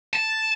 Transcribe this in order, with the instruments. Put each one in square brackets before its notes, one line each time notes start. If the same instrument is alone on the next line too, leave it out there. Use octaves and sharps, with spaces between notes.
[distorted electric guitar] A5